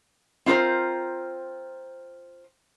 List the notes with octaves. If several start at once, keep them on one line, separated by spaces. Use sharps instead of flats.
C4 F4 F#4 A#4 C5